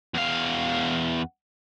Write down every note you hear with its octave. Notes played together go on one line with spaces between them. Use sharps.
E2 F5